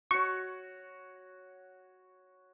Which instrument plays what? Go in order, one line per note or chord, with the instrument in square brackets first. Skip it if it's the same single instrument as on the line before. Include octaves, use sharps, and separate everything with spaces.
[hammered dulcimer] F#4 C#5 [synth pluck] C#6